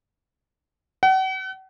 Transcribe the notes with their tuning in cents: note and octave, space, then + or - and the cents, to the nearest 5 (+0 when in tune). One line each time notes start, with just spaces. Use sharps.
F#5 +40